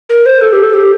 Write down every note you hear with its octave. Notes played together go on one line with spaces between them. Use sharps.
A#4
C5
A4
G4
A4
G4